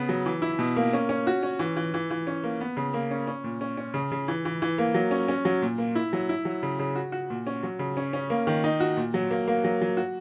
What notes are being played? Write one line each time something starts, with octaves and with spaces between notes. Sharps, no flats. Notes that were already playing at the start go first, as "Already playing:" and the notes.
Already playing: C#3 B3
F#3
E3
E4
B2
A#3
C#4
C#4
F#4
C#4
E3
E3
E3
E3
C#4
A#3
B3
C#3
A#3
C#4
C#4
A#2
C#4
C#4
C#3
C#3
E3
E3
E3
A#3
F#3
C#4
C#4
F#3
A#2
A#3
E4
F#3
E4
F#3
C#3
C#3
F#4
F#4
A#2
C#4
F#3
C#3
C#4
C#4
A#3
D#3
D#4
F#4
A#2
F#3
A#3
A#3
F#3
F#3
F#4